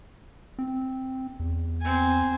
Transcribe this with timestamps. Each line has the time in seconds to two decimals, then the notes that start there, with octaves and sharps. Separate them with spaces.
0.59 C4
1.40 E2
1.81 C4 G#5